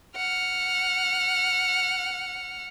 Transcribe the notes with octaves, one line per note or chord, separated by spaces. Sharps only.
F#5 F6